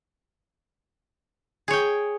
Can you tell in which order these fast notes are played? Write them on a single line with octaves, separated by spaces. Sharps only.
G#4 C#5 G5